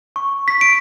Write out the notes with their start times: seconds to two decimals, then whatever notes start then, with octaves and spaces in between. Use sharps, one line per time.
0.16 C#6
0.48 B6
0.61 D7